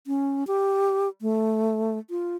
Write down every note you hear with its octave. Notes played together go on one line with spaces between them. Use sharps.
C#4
G4
A3
F4